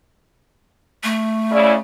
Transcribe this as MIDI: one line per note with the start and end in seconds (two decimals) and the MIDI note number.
1.03 1.78 57
1.52 1.73 49
1.52 1.73 64
1.52 1.73 74